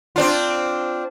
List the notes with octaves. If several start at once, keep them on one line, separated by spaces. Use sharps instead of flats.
C4 D4 F4